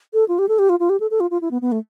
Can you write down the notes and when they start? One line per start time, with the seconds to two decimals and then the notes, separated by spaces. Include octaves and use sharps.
0.14 A4
0.28 F4
0.39 G4
0.48 A4
0.59 G4
0.69 F4
0.80 F4
0.89 G4
1.00 A4
1.11 A4
1.20 F4
1.31 F4
1.41 E4
1.51 B3
1.62 B3
1.72 A3